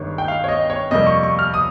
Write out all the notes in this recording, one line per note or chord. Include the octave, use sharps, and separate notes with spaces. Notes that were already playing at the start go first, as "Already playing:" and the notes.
Already playing: G1 G2 D#3 G#3 C#5
G5
F5
C#5
D#5
C#5
F2 C3 G3 A#3 D#5
C#6
C#6
F6
D#6